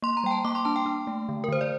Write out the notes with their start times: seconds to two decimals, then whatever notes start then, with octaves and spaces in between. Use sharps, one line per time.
0.02 A#3 C6
0.17 A#5
0.24 G3 G5
0.31 A5
0.45 A#3 D6
0.55 C6
0.65 D4 A5
0.76 G5
0.86 D4
1.07 A3
1.29 D3
1.44 A#4
1.48 D3 C5
1.61 D5